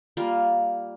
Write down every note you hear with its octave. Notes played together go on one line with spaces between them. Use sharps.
G3 A#3 F4